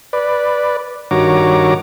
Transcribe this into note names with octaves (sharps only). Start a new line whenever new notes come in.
B4 D5
G2 D#3 F#4 C#5 A#5 D6